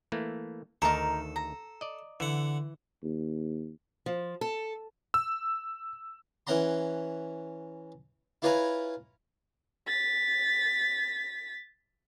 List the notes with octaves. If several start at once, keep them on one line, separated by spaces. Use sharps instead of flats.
E3 A3 A#3
D2 D#3 D#4 A4 A#4 A5
A#5
D5 D#5
D3 E3 F#5
D#2
F3
A4
E6
E3 C#4 F#5 A#5 C6
E4 F4 B4 C#5 G#5 A#5
A6 B6